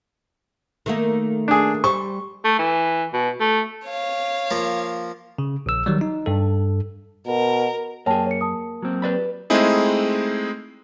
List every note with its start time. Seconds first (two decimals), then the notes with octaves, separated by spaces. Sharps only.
0.86 D#3 A3 A#3
1.48 D4 G#4
1.84 G3 C5 C#6
2.44 A3
2.59 E3
3.13 B2
3.40 A3
3.87 C#5 F5
4.50 F3 A#3 A#4
5.38 C#3
5.66 A#1 E6
5.86 D#3 F#3 G3
6.01 D#4
6.26 G2 A4
7.27 B2 A#4
8.06 F#2 A#3 G#4 C#5 G5 A5
8.27 C#5 C#7
8.41 A5 D#6
8.82 F#3 A#3 C4
9.02 B4 D5 B5
9.50 G#3 A3 C4 D#4 E4 G#4